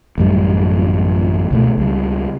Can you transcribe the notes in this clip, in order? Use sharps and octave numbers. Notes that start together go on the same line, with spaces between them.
A1 F#2 G3 A3
C#2 B2 A3
C#2 G3